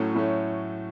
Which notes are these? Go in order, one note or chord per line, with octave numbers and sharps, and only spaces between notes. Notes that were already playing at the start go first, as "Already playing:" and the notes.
Already playing: A2 F#3 A3 C#4
A2 F#3 A3 C#4